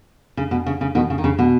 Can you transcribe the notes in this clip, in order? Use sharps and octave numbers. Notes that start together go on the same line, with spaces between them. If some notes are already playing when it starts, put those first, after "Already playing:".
C#3
B2
C#3
C#3
B2 D#3
C#3
D#3
C#3
B2